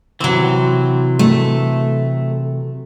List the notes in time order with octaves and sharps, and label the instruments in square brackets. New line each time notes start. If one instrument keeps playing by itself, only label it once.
[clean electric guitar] C3 E3 [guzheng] F#3 C4
[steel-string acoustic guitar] A3